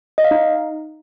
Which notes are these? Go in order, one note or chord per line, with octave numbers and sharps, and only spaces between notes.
D#5
F5
D#4